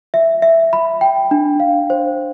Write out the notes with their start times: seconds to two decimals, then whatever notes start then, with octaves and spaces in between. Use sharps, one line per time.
0.14 E5
0.42 E5
0.73 B5
1.01 G5
1.31 D4
1.60 F5
1.90 C5